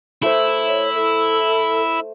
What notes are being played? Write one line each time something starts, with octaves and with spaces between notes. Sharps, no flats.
A3 E4 C5
C#5
A4